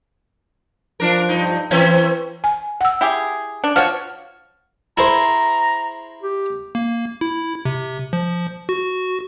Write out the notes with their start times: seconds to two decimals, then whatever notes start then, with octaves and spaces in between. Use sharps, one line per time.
1.00 F3 D4 A#4
1.29 G2 D#4
1.71 E3 C4 C#4 B4
2.44 G#5
2.81 F#5 E6
3.01 E4 G4 G#4
3.64 D4
3.76 F3 F#4 C#5 F6
4.98 E4 G#4 C5 A#5
6.23 G4
6.75 A#3
7.21 E4
7.65 C3
8.13 F3
8.69 F#4